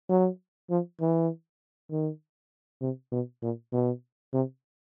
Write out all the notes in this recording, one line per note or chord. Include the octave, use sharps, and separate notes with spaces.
F#3
F3
E3
D#3
C3
B2
A#2
B2
C3